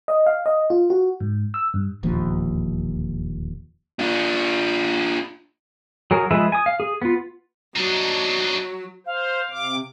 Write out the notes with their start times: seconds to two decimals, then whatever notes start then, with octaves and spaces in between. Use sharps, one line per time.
0.08 D#5
0.26 F5
0.46 D#5
0.70 F4
0.90 F#4
1.20 G#2
1.54 E6
1.74 G2
2.03 E1 A#1 D#2 F3
3.99 D4 F4
6.11 F#3 G#4 A#4
6.31 F3 G#3 G#4 B4 E5
6.52 G#5 D#6
6.66 F5
6.80 G#4
7.02 B3 F4
7.76 F#3 D4 D#4
9.06 C5 F5
9.51 C3 D6